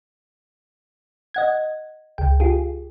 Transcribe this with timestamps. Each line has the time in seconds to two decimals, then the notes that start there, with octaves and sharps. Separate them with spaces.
1.34 D#5 F#5 G#6
2.18 C#2 G5
2.40 F4 G4 G#4